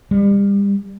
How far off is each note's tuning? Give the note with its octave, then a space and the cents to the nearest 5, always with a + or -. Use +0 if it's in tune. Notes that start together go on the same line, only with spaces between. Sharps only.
G3 +35